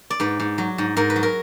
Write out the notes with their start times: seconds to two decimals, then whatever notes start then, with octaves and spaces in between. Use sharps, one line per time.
0.10 D5
0.20 G#2 B4
0.40 G#2
0.58 F#3
0.78 G#2
0.97 G#2 A#4
1.10 B4
1.16 F#3
1.23 A#4